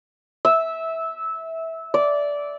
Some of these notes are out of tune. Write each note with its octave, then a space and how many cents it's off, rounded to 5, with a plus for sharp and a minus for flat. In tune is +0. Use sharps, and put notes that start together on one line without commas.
E5 -15
D5 -15